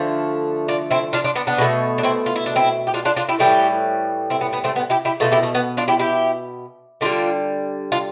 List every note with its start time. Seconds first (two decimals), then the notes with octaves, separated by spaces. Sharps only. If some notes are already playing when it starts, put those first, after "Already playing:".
Already playing: D3 F3 A3
0.68 D4 F4
0.91 C4 E4
1.13 D4 F4
1.24 D4 F4
1.35 B3 D4
1.47 B3 D4
1.58 B2 A3
1.98 D4
2.03 C4 E4
2.26 F4
2.36 E4
2.46 D4
2.56 C4 E4
2.87 G4
2.94 D4 F4
3.05 D4 F4
3.16 D4 F4
3.29 E4 G4
3.39 A2 E3 G3 E4 G4
4.30 C4 E4
4.41 B3
4.53 B3
4.64 A3 C4
4.76 B3
4.90 E4 G4
5.05 E4 G4
5.20 B2 A3 F4 A4
5.32 E4 G4
5.43 A3
5.55 B3
5.77 D4 F4
5.88 E4 G4
5.99 E4 G4
7.01 D3 G3 D4 F4
7.92 D4 F4